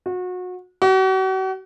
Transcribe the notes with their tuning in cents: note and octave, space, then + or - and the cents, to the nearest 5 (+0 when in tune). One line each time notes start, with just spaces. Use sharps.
F#4 -30
F#4 +40